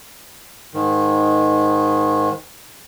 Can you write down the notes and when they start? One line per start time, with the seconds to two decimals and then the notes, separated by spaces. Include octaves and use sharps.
0.74 G#2 D#3